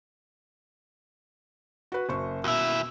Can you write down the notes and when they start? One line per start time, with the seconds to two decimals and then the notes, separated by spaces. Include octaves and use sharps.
1.92 F#4 B4
2.09 F#1 C5 C#6
2.44 D#2 B2 E4